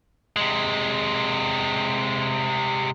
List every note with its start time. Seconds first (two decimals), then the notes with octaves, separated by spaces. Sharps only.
0.36 C3 G#3